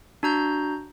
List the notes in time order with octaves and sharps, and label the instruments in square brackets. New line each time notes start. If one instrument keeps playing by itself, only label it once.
[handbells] D4 F#4 A#5 G6